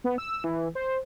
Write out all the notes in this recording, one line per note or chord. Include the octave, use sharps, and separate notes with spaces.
B3
E6
E3
C5